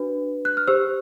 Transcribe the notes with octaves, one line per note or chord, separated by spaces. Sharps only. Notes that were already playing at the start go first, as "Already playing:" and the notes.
Already playing: D4 F#4 B4
F#6
F6
G4 C5 E6